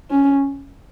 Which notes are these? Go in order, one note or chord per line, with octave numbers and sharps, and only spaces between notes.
C#4